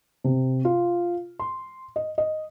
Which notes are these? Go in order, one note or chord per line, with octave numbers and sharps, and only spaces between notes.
C3
F4
C6
D#5
D#5